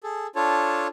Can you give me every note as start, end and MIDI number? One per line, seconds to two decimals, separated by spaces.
0.04 0.27 68
0.04 0.27 69
0.36 0.87 62
0.36 0.87 65
0.36 0.87 69
0.36 0.87 73
0.36 0.87 81